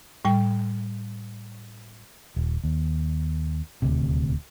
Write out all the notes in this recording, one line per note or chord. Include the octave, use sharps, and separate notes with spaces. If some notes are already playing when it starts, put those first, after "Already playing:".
A2 G3 G5
D#1
D#2
D#1 D2 C3